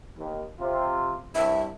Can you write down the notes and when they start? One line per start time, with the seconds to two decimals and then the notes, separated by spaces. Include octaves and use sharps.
0.16 D#2
0.59 C3 F4
1.35 C2 G2 E5